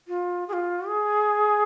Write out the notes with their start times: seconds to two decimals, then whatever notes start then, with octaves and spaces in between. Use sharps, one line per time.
0.08 F4
0.48 G#4
0.53 F4
0.87 G#4